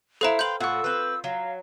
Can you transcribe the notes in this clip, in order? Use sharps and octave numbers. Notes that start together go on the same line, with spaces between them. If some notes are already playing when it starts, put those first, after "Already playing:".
E4 A4 C5 F5 A#5 C6
B4 F5 G5 C6 G6 F#7
A2 F4 F#4 C#6 E6
C4 B4
F#3 F5